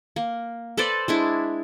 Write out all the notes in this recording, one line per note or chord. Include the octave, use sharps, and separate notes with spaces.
A#3
A4 B4 C5 D5
G#3 D4 E4